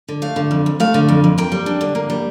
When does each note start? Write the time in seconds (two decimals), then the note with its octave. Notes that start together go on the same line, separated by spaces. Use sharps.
0.08 D3
0.22 A3 F5
0.36 D3
0.51 F2
0.66 F2
0.80 A3 F5
0.94 D3
1.09 F2
1.24 F2
1.38 A#3 G5
1.52 G3
1.66 D4
1.81 D3
1.95 A#3
2.10 G3